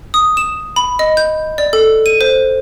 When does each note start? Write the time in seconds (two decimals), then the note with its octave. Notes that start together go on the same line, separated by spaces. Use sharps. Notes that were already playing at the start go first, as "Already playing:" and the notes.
0.14 D#6
0.37 E7
0.76 B5
0.99 D#5
1.17 G6
1.58 D5
1.73 A4
2.06 D#7
2.21 C5